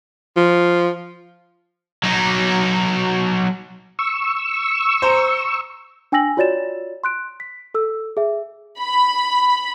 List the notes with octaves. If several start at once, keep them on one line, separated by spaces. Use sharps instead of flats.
F3
F#3 D#4
C#6 E6
C5 A#5
D4 G5 G#5 E6 A#6 F#7
F4 F#4 C#5 D5 A6 E7
C6 F#6 D7
B6
A4 E6
G#4 E5
B5